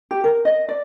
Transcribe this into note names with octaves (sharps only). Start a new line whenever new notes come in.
G4
A#4
D#5
D5